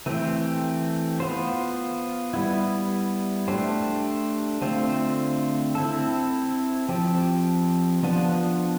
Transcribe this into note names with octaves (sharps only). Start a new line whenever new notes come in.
E3 A3 C4 G4 C5
B3 F4 C5
G3 B3 E4
A3 D4 G4 C5
D3 A3 C4 F4 C5
C4 E4 A4
F3 C4 G4
F3 B3 D4 F4